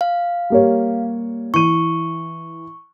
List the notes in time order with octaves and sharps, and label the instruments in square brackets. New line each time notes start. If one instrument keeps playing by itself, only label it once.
[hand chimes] F5
[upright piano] G3 A#3 C#5
[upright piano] E3 D#7 [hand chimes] C#6